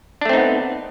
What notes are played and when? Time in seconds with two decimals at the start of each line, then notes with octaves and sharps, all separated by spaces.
0.21 D4
0.25 A3
0.29 C4
0.33 D#4
0.37 B3